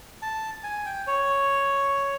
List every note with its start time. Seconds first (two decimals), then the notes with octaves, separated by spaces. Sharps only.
0.22 A5
0.64 G#5
0.86 G5
1.07 C#5